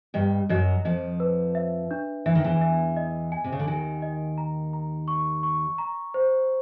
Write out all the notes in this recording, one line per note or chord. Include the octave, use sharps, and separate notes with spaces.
G2 G3 D#5
F#2 F#3 D#5
F2 F3 D#5
B4
E5
D4
E3 E5
D#3
E2 E3
E5
D#5
G#5
C3
C#3
D3
D#2 D#3 G#5
D#5
A#5
A#5
C#6
C#6
A#5
C5